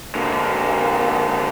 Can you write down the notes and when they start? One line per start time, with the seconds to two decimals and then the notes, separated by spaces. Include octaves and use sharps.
0.15 D3 A#3